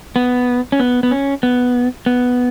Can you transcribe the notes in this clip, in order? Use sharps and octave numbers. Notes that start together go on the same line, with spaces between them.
B3
C#4
B3
B3
C#4
B3
B3